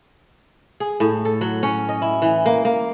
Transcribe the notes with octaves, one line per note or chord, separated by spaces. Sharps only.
G#4
A2
A4
F#3
C#4
D#5
E4
E3
A#3
A#3